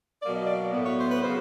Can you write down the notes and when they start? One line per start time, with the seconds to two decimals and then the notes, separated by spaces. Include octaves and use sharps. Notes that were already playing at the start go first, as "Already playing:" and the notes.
0.23 B2 F#3 A#3 D5
0.36 D#5
0.47 D5
0.72 A2 F#3 B3
0.84 C#5
0.97 C5
1.10 B4
1.21 C#3 F#3 A#3 C5